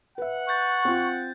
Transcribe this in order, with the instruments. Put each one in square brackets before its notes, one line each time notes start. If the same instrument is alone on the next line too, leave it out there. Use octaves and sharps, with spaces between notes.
[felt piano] B4 E5 [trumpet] F#5
[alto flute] C#6 [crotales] F#6 G6 A6
[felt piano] C4 F4